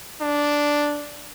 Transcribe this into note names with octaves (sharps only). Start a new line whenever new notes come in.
D4